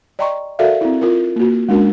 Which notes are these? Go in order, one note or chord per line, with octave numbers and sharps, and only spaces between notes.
D5 D#5 G5 A#5 C6 C#6
F#4 A4 A#4 D5 E5 F5
C4 E4
F4 A#4
A#3 F#4
G#3 C#4 D4 F#4 A#4